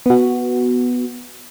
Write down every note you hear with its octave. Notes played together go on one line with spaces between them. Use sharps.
B3 F#4